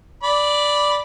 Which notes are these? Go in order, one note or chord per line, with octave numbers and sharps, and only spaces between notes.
D5 B5